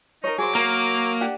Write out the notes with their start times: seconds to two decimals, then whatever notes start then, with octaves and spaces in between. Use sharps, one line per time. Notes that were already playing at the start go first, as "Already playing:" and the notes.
0.24 D#4 A#4 C#5
0.38 F#3 G#4 C5 D6
0.55 A#3 A#4
1.21 D4 G4 F#5